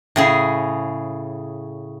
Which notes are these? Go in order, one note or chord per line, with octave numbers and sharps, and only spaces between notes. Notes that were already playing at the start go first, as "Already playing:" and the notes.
A2 C#3 G#4